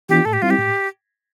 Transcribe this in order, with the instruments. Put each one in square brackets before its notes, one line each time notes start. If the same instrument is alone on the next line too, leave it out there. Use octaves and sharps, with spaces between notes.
[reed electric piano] E3 B3 D4 F4 [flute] G4
[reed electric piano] A2 [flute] A4
[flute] G4
[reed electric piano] G3 C4 E4 [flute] F4
[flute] G4
[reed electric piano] A2